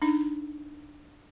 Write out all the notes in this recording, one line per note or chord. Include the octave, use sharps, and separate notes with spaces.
D4 D#4